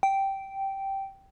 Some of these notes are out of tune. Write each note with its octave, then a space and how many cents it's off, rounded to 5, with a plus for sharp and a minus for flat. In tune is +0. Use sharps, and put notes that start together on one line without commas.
G5 -10